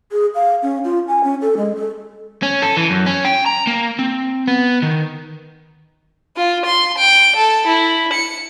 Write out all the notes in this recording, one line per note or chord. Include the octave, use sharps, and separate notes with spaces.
G#4
F5
C#4
F4
G#5
C#4
A4
G#3
A4
C#4
A4
E3
F#2
C#4
G5
A#5
A#3
C4
B3
D#3
F4
C6
G5
A4
E4
C#7